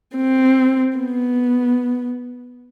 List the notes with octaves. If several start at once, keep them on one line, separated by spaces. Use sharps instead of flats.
C4
B3